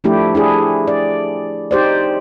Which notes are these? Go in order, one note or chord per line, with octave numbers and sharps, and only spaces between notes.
F3 A3 D4 E4 G4
D4 E4 G#4
D5
D#4 G4 C5 D5